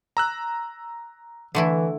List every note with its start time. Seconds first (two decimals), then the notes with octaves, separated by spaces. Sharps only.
0.17 A#5 E6 F#6
1.55 D3 E3 A3 E4